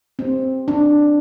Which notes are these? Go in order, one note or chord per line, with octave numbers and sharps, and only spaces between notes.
C4
D4